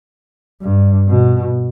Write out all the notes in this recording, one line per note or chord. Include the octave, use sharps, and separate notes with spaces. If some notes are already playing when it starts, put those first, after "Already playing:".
G2
B2